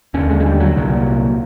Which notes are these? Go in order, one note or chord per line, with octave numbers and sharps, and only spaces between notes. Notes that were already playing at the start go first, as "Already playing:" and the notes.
D#2 D3 C#4
G#3
G#3
G3
F#3
C2 A#2